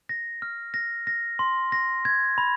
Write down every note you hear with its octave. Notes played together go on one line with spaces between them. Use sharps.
A#6
F6
A#6
A#6
C6
A#6
G#6
B5